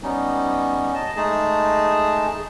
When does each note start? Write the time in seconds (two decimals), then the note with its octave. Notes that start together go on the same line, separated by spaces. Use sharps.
0.03 G3 B3 C#4 D#4
0.95 D#5 A5
1.16 G#3 A3 D#4 G#4 A5